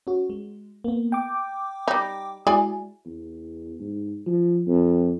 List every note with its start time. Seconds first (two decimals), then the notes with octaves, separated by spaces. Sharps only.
0.07 C#4 F#4
0.30 G#3
0.84 A#3 B3
1.12 G5 D6
1.88 G3 D#4
2.47 G#3 E4 F#4 G#4 D5 G#5
3.05 E2
3.80 G#2
4.27 F3
4.67 F2